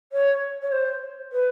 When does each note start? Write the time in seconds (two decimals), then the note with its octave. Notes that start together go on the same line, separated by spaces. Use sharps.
0.12 C#5
0.62 C#5
0.72 C5
1.32 B4